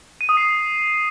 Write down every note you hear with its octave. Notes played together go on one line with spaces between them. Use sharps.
D#7
D#6
C7